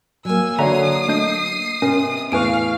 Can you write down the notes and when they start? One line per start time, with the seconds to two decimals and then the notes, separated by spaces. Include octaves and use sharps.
0.25 F#3 A#3 G#5 E6
0.58 D3 F#4 C#5 E5 A#5 D#6 C7
1.08 A3 D4 D#5 G6
1.82 C3 B3 C#4 A#4
2.32 E2 A2 B4 F5 G#5 C#6 D7